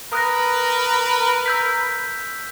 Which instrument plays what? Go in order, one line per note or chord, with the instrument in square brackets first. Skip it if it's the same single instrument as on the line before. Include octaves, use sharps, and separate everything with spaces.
[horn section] A#4 B4 [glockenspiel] D#6 F#6 A#6
[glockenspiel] E6 G6 B6